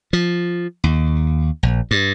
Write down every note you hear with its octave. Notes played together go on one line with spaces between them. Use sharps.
F3
D#2
A#1
G2